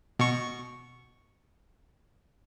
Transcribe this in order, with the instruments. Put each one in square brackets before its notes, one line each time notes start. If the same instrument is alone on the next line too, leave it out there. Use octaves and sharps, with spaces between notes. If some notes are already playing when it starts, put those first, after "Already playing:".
[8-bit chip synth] B2 C#6